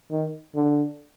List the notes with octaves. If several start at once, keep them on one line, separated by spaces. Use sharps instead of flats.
D#3
D3